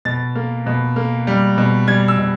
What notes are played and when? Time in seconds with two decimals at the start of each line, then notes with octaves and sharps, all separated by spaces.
0.05 B2 A6
0.35 A#3
0.66 B2
0.96 A#3
1.27 G3
1.58 B2
1.87 G3 G#6
2.08 E6
2.18 B2